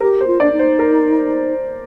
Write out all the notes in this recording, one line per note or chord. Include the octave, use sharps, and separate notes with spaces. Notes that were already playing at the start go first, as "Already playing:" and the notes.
G4 A#4
C5
F4
D4 D5
D#4
C5
A#4